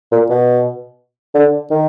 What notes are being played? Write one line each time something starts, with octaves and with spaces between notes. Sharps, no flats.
A#2
B2
D3
D#3